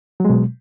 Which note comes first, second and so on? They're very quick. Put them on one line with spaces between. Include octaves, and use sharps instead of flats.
F#3 G#3 B2